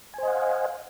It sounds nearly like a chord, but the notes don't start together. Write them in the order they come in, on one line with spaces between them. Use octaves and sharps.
G#5 C5 D#5 F#5 F5